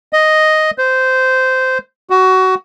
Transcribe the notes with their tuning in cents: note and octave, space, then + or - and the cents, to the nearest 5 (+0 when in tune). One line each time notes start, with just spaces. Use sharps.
D#5 +0
C5 -15
F#4 +20